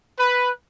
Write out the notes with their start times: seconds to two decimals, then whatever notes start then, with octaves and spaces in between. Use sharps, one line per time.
0.18 B4